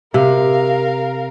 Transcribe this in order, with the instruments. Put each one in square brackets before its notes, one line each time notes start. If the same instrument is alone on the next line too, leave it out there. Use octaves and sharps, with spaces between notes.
[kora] C3 [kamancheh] A#4 F5